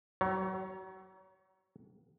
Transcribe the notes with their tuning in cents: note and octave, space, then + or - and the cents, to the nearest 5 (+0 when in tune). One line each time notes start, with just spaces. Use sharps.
F#3 +35 C#5 +5